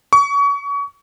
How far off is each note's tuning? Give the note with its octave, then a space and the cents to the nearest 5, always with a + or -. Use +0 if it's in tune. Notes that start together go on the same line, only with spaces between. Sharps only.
C#6 +30